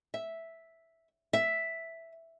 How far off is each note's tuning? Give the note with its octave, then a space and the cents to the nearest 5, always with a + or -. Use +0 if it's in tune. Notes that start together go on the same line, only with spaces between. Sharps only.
E5 -5
E5 +0